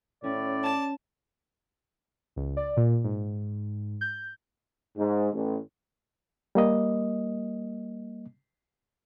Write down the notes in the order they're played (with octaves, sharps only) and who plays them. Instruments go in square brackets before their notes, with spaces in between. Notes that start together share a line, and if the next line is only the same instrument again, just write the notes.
[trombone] A2 [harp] C#4 [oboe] D5
[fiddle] A5
[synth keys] C#2
D5
A#2
G#2
G6
[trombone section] G#2
A1
[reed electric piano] G3 A#3 D#5